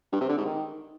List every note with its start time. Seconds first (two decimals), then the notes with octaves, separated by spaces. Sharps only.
0.12 G2
0.21 C3
0.29 D3
0.37 G#2
0.46 D#3